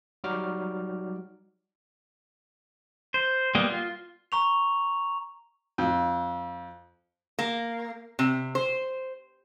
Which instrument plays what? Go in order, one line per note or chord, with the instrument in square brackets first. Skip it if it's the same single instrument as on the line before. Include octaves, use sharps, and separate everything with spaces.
[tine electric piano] F#3 G3 D#4 F#4 D6 F6
[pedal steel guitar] C5
G3 A#3 B3 D#5
F4
[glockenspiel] A#5 C#6 F7
[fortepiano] F2
[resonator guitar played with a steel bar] A#3
C3
C5